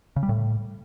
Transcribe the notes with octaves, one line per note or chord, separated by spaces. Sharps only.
C#3
G3
A2